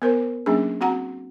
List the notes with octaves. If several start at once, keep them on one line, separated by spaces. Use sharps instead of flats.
B3 A#4 C5
F#3 A#3 C#4 D4 G#4
C4 F#4 F#5 A#5